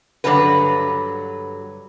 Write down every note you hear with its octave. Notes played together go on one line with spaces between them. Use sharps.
G2 B2 D3 F#3 F#4 B4